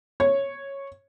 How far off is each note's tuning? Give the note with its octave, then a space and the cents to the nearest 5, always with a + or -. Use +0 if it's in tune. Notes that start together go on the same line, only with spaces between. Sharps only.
C#5 -10